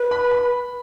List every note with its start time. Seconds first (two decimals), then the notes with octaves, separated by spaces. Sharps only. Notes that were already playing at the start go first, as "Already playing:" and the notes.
Already playing: B4
0.11 B5
0.31 B5